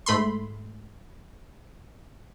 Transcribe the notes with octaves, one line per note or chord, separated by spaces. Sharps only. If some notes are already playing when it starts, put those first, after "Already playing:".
G#2 A3 B5 C6